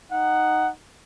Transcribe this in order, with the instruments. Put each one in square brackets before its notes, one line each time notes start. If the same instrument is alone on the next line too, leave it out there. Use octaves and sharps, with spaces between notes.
[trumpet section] D#4 F#5